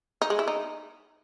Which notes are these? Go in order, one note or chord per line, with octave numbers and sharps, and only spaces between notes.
D#4
G#3
E4
D#4